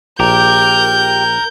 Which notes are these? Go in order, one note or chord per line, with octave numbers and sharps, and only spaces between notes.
A#1 G4 A#4 G6